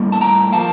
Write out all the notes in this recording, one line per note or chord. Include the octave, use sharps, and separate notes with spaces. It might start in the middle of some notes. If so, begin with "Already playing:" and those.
Already playing: A2 G3 A#3
A5
G5 A#5
F3 A#3 F5 A5